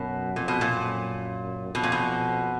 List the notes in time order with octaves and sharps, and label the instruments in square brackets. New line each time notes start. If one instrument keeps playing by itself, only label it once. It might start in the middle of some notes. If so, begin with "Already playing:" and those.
Already playing: [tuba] F#2 [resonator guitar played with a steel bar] B2
[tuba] F2 [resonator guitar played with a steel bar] A#2
[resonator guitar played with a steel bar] B2
A#2
[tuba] F#2
[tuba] F2 [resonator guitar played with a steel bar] B2
[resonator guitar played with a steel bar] A#2
B2